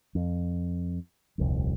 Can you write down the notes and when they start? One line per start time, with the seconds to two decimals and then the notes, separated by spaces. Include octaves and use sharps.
0.15 F2
1.38 D#1 C2 F2